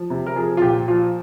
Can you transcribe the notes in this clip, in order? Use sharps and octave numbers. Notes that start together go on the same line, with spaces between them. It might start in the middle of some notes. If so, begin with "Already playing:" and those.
Already playing: F3
C3
A#4
F3 G#4
F4
A#2 G4
F3 F4